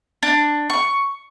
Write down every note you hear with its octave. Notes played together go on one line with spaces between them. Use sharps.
D4
C#6